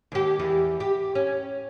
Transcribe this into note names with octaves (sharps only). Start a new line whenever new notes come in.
D#2 G4
E2
G4
C#4